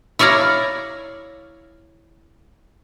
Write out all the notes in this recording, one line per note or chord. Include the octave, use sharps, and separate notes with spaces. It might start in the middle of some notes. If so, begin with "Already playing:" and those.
E4 C#5 D5 F5 A#5